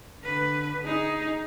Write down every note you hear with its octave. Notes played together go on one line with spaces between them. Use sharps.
D3 B4
D#4 G#4